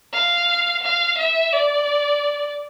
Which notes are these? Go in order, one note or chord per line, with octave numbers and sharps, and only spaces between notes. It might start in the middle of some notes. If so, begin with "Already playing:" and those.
F5
F5
E5
D5